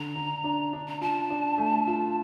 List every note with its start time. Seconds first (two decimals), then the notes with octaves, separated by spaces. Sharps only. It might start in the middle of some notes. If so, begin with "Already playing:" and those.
Already playing: D3 A#5
0.15 D3
0.44 D4
0.73 D4
0.88 A#5
1.01 F4 A5
1.30 D4
1.58 A3
1.87 F4